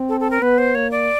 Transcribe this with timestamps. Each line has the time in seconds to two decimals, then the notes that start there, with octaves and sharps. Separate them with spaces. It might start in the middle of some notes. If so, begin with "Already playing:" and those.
Already playing: C4
0.09 A4
0.20 A4
0.31 A#4
0.42 B3 B4
0.58 C5
0.75 A#3 C#5
0.91 D5